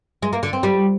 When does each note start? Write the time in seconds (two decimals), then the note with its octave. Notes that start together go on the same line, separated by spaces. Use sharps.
0.22 G#3
0.33 A#3
0.43 D3
0.53 C4
0.63 G3